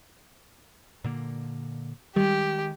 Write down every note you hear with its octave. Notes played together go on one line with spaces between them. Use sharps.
A#2 D3 A#3
D#3 G3 G#3 G4